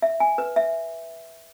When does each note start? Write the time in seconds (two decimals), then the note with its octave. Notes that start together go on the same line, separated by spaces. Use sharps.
0.02 E5
0.20 G#5
0.38 B4
0.56 E5